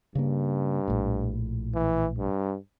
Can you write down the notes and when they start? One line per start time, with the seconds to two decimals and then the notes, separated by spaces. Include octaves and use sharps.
0.15 G2 C#3 A#3
0.88 A#1 A2
1.75 E3
2.18 G2